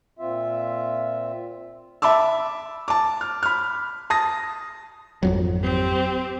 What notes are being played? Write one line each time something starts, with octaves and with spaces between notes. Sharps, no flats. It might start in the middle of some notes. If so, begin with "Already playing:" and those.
A#2 C4 F4 E5
E5 A5 B5 D6 E6
A5 D6
F6
B5 F6
A5 D#6 A#6
G#1 F2 F#3
C4 G4